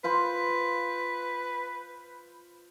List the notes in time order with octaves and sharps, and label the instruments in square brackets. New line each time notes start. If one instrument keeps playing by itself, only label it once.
[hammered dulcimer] F4 C5 B5 [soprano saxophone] B4